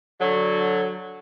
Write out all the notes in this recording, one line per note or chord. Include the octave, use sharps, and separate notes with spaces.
D3 F#3